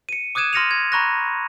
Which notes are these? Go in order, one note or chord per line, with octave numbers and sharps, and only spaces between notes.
C#7 D#7
D6 D#6 F#6 G#6 D#7 E7
C6 F6 A#6 C#7 D#7 F7
G#6
A#5 B5 C#6 F#6 A#6